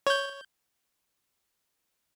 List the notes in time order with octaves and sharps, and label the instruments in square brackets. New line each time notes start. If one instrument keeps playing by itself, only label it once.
[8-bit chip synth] C#5 G6